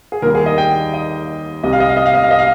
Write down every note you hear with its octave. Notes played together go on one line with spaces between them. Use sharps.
G#4
D#2 D#3 G3 A#4
G#4
D#5
G5
D#5
C2 C3 G3 D#5
F5
D#5
F5
D#5
F5
D#5
F5
D#5
F5